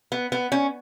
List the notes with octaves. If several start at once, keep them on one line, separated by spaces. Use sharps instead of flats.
B3
B3
C#4